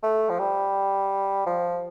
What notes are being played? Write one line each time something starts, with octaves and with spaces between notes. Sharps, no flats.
A3
F3
G3
F3